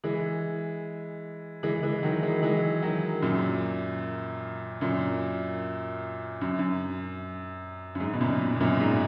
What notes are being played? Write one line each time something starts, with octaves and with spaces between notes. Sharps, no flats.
E3 G#3
E3 G#3
E3 G#3
D#3 F#3
E3 G#3
E3 G#3
D#3 F#3
F#2 A#2
F#2 A#2
F#2
F#2
F#2
G#2
B2
F#2 A#2
B2
F#2 A#2
G#2